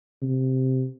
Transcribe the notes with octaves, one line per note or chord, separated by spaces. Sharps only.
C3